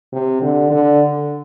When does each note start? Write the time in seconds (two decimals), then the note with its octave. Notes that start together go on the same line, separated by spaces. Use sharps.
0.13 C3
0.42 D3
0.71 D3